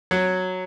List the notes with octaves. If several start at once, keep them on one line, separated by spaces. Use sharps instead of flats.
F#3